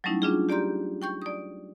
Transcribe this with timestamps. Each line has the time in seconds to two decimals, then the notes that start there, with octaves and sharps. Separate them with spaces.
0.04 F#3 G3 A3 C#4 D#4 E4
0.22 C#4 D4 F4 G#4
0.49 G4 D5 A#5 C6 G6
1.02 G5 C#6 G6
1.22 D5 D#6